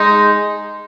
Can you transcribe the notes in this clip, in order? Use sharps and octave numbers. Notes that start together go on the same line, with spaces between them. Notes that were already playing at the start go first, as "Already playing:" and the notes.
Already playing: G#3 D#4